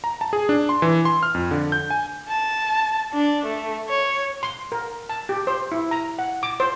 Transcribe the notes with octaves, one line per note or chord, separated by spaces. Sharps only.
A#5
A5
G#4
D4
C6
E3
C6
F6
F2
D3
G6
G#5
A5
D4
A3
C#5
C6
A#4
A5
G4
C5
E4
A#5
F#5
D6
C5